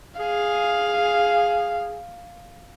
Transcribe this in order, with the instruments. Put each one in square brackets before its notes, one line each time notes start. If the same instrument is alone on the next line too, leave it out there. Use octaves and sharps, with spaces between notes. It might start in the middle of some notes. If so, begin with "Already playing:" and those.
[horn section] G#4 [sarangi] F5